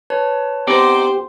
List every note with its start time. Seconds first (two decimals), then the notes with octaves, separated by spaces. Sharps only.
0.10 B4 C#5 A5
0.67 B3 C4 D#4 G4 C5 D5